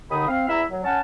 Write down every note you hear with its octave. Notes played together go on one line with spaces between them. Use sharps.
D#2 D3 D#4 B5 D#6
C4 F5
E2 E4 E5 A#5 B5 E6
F#3
C#4 F#5 A5